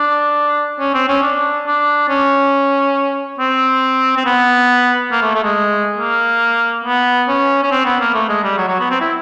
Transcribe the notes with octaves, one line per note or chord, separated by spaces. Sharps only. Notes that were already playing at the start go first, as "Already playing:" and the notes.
Already playing: D4
C#4
C4
C#4
D4
D4
C#4
C4
C4
B3
A#3
A3
A3
G#3
A#3
B3
C#4
C#4
C4
B3
A#3
A3
G#3
G3
F#3
F#3
B3
C4
E4